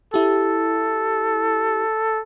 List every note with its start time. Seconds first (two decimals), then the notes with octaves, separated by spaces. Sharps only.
0.14 E4 G4 A4